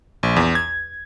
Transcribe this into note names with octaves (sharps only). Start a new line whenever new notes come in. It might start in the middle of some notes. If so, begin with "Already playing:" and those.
A#1
E2
G#6